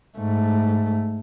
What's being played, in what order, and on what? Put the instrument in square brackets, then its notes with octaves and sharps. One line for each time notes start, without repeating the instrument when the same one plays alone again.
[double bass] G#2 A3